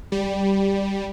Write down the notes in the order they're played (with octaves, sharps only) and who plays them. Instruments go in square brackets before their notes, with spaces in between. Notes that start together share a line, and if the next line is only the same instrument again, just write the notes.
[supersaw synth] G3